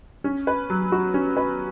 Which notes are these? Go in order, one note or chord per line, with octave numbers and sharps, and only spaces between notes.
C#4
B4
F#3
F#4
C#4
B4